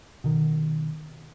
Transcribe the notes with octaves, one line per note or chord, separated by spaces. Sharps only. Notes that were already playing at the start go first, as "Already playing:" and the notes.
B2 D#3